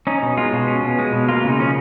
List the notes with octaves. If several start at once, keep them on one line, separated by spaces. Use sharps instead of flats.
C#4 D#4
B2
G#3 F4
B2
C#4
B2
G#3
B2
A#3 F4
C#3 D#4
F3 C#4